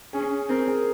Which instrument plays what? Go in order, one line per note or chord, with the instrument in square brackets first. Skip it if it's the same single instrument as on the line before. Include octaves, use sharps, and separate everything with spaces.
[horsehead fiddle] C#4 [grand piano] G#4
[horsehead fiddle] C4 [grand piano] A#4
[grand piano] G#4